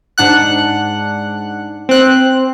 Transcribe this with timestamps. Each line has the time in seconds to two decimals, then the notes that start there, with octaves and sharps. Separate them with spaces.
0.18 G#2 D4 F#5 F#6
1.89 C4 F#6